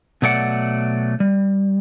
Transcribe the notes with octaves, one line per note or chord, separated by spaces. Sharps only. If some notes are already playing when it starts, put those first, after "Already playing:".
B2 F#3 A3 D5 F#5
G3